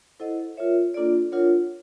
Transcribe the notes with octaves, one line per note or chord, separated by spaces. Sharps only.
E4 A4 C5 D#5 F#5
F4 A#4 C#5 E5
A#3 D4 F4 A4 D5
D4 F4 A#4 C#5 F#5